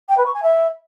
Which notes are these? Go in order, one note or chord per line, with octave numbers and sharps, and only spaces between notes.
G5
B4
C#6
G#5
E5